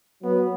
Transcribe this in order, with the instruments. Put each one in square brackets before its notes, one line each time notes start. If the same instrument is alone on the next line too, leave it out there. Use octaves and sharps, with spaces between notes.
[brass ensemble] F#3 [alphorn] B3